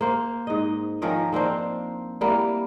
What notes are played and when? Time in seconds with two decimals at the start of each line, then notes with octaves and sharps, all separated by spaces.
0.01 A#3 C5
0.47 G#2 D#5
1.02 D#3 F3 C#4 A#4
1.32 A#3 C4 D4 C5
2.21 G3 A#3 E4